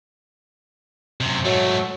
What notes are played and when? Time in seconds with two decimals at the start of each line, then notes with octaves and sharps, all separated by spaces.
1.21 F#2 C3
1.45 G#2 F#3 A3